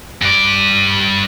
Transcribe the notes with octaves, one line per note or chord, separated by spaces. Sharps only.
G2 D5